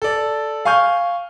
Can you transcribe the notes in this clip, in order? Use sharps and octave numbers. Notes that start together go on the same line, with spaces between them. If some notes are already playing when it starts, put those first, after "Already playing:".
A4 D5
F5 G#5 C#6 F6 G6